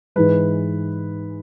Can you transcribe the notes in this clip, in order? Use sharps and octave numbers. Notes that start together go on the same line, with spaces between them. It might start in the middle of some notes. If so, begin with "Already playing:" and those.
G#2 E3 G#3 B4